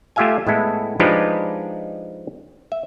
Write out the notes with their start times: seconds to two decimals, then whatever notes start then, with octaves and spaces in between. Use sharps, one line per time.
0.16 A3 F4 G4 E5 F5 G#5
0.47 A2 G#3 B3 E4 A4
1.00 F3 G#3 D4 D#4 G4 B4
2.72 E5